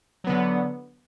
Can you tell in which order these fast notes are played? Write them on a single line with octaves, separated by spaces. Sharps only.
F#3 B3 D3